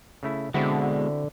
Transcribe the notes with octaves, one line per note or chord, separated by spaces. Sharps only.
C#3 A3 E4
B2 D3 G#3 C4 E4 F#4